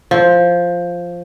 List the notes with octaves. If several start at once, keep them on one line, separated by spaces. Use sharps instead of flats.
F3